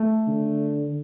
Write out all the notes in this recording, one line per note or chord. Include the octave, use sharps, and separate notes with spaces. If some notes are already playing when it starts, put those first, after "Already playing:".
Already playing: A3
D3